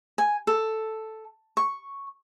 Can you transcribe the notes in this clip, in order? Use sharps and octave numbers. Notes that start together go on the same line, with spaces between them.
G#5
A4
C#6